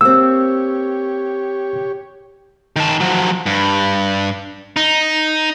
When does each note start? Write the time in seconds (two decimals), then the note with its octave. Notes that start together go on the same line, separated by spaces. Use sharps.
0.01 A#3 C4 G4 C#5 E6
2.76 D#3 A5
3.00 F3 F#3
3.46 G2
4.77 D#4